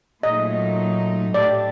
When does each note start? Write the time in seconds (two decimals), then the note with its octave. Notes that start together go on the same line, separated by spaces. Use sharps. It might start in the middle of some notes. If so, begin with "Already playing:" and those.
0.23 A#2 F#3 A3 D#4 D#5
1.34 A2 A3 D4 G4 D5